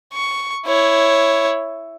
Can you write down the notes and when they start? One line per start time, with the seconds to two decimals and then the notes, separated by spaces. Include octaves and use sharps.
0.14 C#6
0.66 E4 C#5